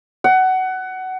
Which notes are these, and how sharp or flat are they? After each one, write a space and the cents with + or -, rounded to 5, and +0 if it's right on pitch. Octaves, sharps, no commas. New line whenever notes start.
F#5 +20